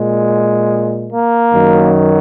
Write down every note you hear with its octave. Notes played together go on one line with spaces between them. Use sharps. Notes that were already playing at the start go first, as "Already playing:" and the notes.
Already playing: A#2 G#3
A#3
F#2 D#3 F#3